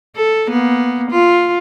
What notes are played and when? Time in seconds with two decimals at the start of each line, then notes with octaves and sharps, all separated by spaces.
0.16 A4
0.48 A#3 B3
1.11 F4